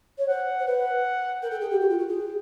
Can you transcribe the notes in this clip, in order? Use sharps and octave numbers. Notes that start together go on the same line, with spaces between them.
C#5
C5 F#5
C5
B4 F#5
A#4 G5
A4
G#4
G4
F#4
F4
F#4
G#4